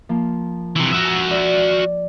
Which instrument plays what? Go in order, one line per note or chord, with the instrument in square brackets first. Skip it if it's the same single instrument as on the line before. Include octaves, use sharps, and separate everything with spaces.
[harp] F3 A#3
[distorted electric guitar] C3 E3
F#4 E5
[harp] D5